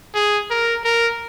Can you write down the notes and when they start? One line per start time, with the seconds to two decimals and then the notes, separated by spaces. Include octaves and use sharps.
0.15 G#4
0.50 A#4
0.84 A#4